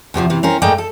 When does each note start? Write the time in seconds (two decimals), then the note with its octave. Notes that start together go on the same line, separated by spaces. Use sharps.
0.14 E2 C3 E3 F3
0.30 C3 E3
0.43 C4 C#4 A#4
0.62 G#2 A3 A#3 D#4 D5 G5
0.78 A4